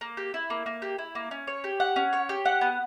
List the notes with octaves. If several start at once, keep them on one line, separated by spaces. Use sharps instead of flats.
A#3
G4
E4
A#3
A#3
G4
E4
A#3
C#4
C#5
G4
F#5
C#4
C#5
G4
F#5
B3